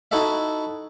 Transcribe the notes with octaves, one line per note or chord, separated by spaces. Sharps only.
D#4 E4 F#4 A4 D#5 E5